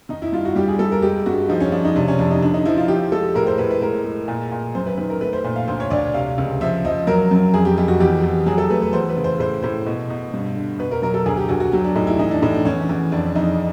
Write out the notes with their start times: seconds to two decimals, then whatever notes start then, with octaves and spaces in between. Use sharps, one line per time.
0.09 D#3 D#4
0.22 E4
0.32 G2 F4
0.45 F#4
0.56 G3 G4
0.68 G#4
0.79 G3 A4
0.92 A#4
1.02 G#3 G4
1.26 G2 F#4
1.49 F3 D#4
1.60 C#4
1.72 F3 D4
1.85 D#4
1.96 C3 D4
2.08 C#4
2.19 F2 D4
2.31 D#4
2.42 D3 D4
2.54 D#4
2.65 F3 E4
2.78 F4
2.88 F3 G4
3.12 G#3 A4
3.35 A2 A#4
3.47 C5
3.58 A2 B4
3.71 B4
3.81 G#3 A#4
4.04 G#3
4.28 A#2
4.51 A#2
4.75 F#2 C5
4.86 B4
4.97 D#3 B4
5.10 A#4
5.21 A3 B4
5.33 C5
5.44 A#2
5.56 F5
5.68 D2 C5
5.80 C#5
5.90 D2 D5
6.14 C3 F5
6.38 C#2
6.61 F3 E5
6.85 F3 D#5
7.07 F#3 A#4
7.31 F#2
7.54 F2 G#4
7.65 G4
7.77 F2 G4
7.88 F#4
8.00 E2 G4
8.23 E2
8.46 F#3 G#4
8.58 A4
8.70 A3 B4
8.82 B4
8.93 E2 C5
9.09 B4
9.16 C#3
9.24 C5
9.39 A2 C5
9.63 A2 C5
9.86 B2
10.10 B2
10.34 G2
10.56 D3
10.79 B2 B4
10.91 A#4
11.02 F#3 A#4
11.14 A4
11.26 D2 G#4
11.37 G4
11.49 D2 F#4
11.60 F#4
11.72 F#3 G4
11.84 D4
11.95 A2 D#4
12.07 E4
12.19 E3 D#4
12.31 D4
12.42 A2 D#4
12.54 D4
12.65 E2 C#4
12.89 E2
13.12 F2 D4
13.35 F2 D#4